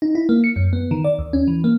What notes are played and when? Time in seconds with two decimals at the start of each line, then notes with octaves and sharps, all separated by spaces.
0.02 D#4
0.15 E4
0.29 A#3
0.44 C#7
0.56 F#2
0.73 B3
0.91 D#3
1.04 D5
1.19 D#2
1.33 C#4
1.48 E3
1.64 A#3